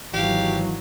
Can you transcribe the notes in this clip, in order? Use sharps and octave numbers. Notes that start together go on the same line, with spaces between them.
G#1 E3 F#3 G4 F5